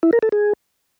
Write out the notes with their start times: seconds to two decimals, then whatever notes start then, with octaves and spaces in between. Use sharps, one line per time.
0.03 E4
0.13 A#4
0.23 A4
0.32 G#4